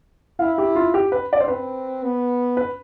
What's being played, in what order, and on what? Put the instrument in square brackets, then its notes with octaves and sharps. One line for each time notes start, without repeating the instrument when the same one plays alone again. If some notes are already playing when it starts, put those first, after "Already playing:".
[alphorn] E4 [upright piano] F5
[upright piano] G4
F4
G4
B4
D5
C5
[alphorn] C4 [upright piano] B4
[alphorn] B3
[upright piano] B4